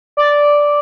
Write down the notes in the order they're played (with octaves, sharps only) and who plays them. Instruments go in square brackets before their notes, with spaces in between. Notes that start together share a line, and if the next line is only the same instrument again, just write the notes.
[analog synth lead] D5